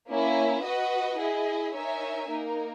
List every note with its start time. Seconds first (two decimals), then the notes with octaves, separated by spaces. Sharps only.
0.08 A#3 C#4 E4
0.63 F#4 B4 D#5 F#5
1.18 E4 G#4 D#5
1.73 D#4 A#4 C#5 E5 G#5
2.28 A#3 D#4 A#4